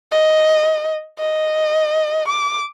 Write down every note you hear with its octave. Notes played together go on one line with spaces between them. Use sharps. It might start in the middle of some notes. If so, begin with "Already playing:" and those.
D#5
D#5
D6